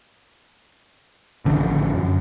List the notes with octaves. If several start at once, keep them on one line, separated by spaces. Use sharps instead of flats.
A1 D3 F3 C#4
F#2